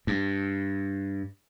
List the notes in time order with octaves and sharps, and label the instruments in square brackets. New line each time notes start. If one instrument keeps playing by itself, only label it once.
[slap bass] G2